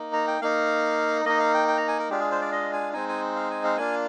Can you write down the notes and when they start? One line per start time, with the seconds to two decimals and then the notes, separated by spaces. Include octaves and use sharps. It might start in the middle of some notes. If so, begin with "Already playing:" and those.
Already playing: A#3 D#4
0.13 A#5
0.28 G5
0.42 A#3 D#4 F5
1.25 A#3 D#4 D#5
1.40 F5
1.54 G5
1.68 G5
1.78 A#5
1.88 G#5
1.99 A#4
2.09 G#3 D4 F4 G4
2.20 G#4
2.31 C5
2.41 D5
2.52 D#5
2.73 G#5
2.93 G#3 C4 D#4 G#5
3.08 G#5
3.36 F5
3.51 G#5
3.64 F5
3.77 A#3 D4 F4 G#5